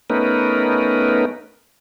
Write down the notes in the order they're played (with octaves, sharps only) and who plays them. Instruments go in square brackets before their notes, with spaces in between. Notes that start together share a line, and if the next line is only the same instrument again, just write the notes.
[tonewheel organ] A3 B3 C#4 D#4 A#4 B4